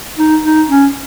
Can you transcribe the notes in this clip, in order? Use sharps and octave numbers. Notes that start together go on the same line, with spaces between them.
D#4
D#4
C#4